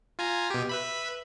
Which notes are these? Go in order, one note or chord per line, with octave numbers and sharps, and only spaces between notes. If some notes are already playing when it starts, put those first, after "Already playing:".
F4 G#5 A#5
B2 G4
B4 E5 B5